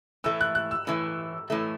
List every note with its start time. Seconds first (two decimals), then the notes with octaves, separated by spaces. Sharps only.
0.24 A2 E3 A3 E6
0.41 F#6
0.55 F#6
0.71 E6
0.87 A2 E3 A3
1.50 A2 E3 A3